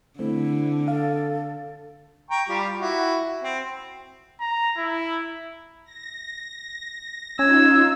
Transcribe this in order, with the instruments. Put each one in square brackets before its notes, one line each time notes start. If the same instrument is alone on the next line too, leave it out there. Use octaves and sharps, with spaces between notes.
[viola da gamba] D3 [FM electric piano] A3 C4 [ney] E4
[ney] A4 [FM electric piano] F5
[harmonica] G5 A#5 C#6
G3 F4 G4
E4 F#4
C4
[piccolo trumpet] A#5
E4
[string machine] A#6
[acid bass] C#4 [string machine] D#4 F4 [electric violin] E6 [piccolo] G#6